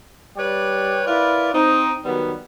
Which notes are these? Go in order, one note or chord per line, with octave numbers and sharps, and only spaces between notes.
G3 B4 C#5 D5 G5
E4 F4 A#4 B4 D5
C4 D#4
D#3 F#3 G3 B3